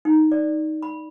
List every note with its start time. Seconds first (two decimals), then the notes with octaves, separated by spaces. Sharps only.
0.05 D#4
0.32 D5
0.82 B5